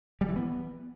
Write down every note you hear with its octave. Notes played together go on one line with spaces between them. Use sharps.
G3
E3
B3